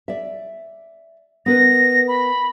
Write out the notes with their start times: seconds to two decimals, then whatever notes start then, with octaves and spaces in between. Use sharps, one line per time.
0.08 D5 E5
1.46 B3 A#4 B4 A#6
2.08 B5